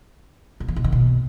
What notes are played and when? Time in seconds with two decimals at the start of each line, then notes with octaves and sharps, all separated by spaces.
0.60 C#3
0.68 E3
0.76 B2
0.84 D#3
0.92 B2